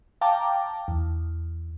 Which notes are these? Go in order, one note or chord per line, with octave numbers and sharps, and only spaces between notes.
F5 G5 A5 A#5 D6
E2